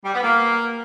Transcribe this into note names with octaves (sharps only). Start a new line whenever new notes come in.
G3
B3
A#3